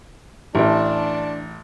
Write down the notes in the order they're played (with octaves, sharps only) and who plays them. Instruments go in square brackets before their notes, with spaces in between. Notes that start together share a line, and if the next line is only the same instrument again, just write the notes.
[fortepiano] A1 [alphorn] D4